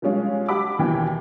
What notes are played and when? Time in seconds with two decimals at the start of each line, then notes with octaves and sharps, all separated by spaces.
0.02 F3 G3 G#3 C#4 F4
0.49 G4 F#5 B5 D6
0.79 D#2 B2 E3 G5